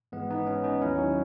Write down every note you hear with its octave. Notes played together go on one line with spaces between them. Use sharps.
G#1 G#2 E3 G#3 B3
B3 D#4
C#4
B3 D#4
D#2 D#3 F#3 C#4 E4
D#4 F#4